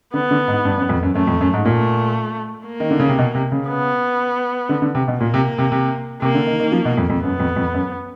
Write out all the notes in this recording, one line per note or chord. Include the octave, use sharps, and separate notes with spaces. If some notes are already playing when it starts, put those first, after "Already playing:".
D3 B3
D3
G#2
G2
F#2
F2
F#2
F#2 A3
F2
F#2
G#2
A#2 A3
A#3
D#3
D3
C#3
C3
B2
C3
C#3
B3
D3
D3
C3
B2
A#2 A#3
C3
C3
C3
C3 A#3
D3
D#3
D#3
F3
B2
F2
F2
F#2 B3
F2
F2
F#2